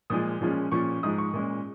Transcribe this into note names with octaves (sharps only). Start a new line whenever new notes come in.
A#2 F3 G#3 D#6
A#2 F3 G#3 C#4
A#2 F3 C#4 C#6
G#2 F3 G#3 D#6
C#6
A#2 G#3 C#4